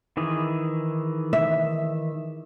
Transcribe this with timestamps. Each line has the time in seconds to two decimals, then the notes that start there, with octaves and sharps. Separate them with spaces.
0.17 D#3 E3 G#4
1.33 E5